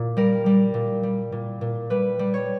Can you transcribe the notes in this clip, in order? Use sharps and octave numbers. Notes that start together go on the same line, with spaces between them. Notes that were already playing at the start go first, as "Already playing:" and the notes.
Already playing: A#2
G3 A#4
G3
A#2
G3
A#2
A#2
G3 B4
G3
C#5